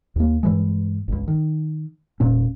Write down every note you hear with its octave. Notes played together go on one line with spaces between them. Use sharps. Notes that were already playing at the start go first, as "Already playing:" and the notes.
D#2 A#3
G2 E3 G#3
G1 C#2
D#3
E1 A#2 C#4